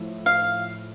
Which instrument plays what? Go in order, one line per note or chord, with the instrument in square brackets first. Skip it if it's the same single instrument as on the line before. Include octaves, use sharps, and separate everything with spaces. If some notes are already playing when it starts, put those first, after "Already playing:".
Already playing: [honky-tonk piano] A2 F3
[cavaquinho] F5